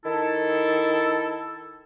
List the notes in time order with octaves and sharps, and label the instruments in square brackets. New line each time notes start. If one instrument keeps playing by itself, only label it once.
[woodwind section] D#3 E4 A4